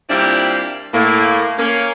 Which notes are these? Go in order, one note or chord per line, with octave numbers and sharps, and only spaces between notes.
A#2 G3 A#3 C4 D4 E4
A2 A#3
A#3 C#4